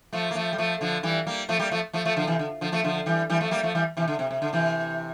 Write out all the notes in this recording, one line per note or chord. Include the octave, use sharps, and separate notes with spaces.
F3 A3
A#3
F3 A3
G3
F3 A3
D3 F3
E3 G3
G3 A#3
F3 A3
G3 A#3
F3 A3
F3 A3
F3 A3
D3 F3
C3 E3
D3
D3 F3
F3 A3
D3 F3
E3 G3
E3 G3
F3 A3
G3 A#3
F3 A3
E3 G3
C3 E3
D3
C3
C3
D3
C3 E3